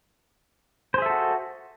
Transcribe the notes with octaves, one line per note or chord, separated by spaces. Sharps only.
F#4 G#4 A4 C5 E5